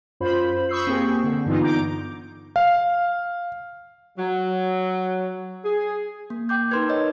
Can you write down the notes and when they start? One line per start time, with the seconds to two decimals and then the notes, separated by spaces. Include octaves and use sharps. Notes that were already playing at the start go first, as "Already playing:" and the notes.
0.20 F#2 F4 C5 B5
0.69 B5 C#6 D#6 E6 G6 C7
0.87 A#3 C4 G4 G#4
1.24 D3
1.46 G2 D3 E3 B3 D#4 F4
1.62 A#5 D6 G6 D7
2.56 F5
4.18 F#3
5.64 G#4
6.30 A#3
6.49 G5 D6 G6
6.71 D#4 A#4 B4 C6 G#6
6.89 C#5 D#5